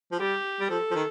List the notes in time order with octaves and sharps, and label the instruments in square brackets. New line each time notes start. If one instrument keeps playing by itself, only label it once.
[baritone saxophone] F3
[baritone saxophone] G3 [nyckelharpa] G4
[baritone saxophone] G3
[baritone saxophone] F3 [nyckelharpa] A4
[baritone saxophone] F3
D#3